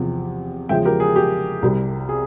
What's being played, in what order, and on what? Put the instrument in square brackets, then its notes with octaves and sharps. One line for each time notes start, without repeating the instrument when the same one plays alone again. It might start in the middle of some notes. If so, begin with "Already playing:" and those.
Already playing: [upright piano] E2 C3 F3
E2 C#3 F3 G#3 E5 G5
G4 A#4
G#4
G4
C2 C3 G3
G#4